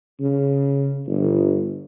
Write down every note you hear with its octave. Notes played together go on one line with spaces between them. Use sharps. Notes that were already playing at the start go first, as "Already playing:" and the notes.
C#3
G1